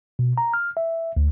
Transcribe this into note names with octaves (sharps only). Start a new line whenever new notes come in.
B2
A#5
F6
E5
D2